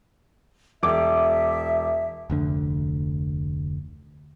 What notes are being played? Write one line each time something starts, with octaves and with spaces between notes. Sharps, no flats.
E1 E5 D6
F1 D2 D3